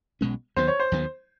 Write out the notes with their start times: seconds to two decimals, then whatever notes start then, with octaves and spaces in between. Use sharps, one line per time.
0.21 B1 B2 G#3 C#4
0.56 D#2 D#3 F#3 B3 C5
0.68 C#5
0.80 C5
0.92 D#2 D#3 F#3 B3